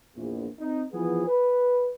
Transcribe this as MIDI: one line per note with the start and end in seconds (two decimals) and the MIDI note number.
0.16 0.47 34
0.16 0.47 40
0.60 0.83 60
0.60 0.83 63
0.93 1.24 52
0.93 1.24 53
0.93 1.24 59
0.93 1.24 68
1.27 1.90 71